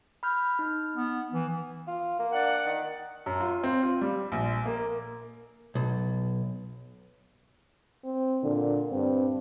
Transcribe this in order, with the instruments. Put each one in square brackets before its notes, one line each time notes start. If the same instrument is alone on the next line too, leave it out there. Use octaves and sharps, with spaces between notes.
[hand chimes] B5 F6 G6
D#4 F6
[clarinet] B3
E3
[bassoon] F4
A#3
[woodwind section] D4 D5 F#5
[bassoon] D#3
[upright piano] F#2
F4
C4
F4
G3
A#1
A#3
[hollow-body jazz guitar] B1
[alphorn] C4
[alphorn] A#2 [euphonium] D3
[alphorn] G2 [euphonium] C4